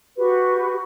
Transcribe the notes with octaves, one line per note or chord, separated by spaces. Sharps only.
F#4 G4 B4 C#6